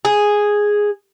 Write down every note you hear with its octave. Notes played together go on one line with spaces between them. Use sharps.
G#4